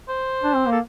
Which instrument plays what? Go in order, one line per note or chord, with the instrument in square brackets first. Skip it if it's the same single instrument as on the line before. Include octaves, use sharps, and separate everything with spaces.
[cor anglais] C5
[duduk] D4
C4
A#3
[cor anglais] A4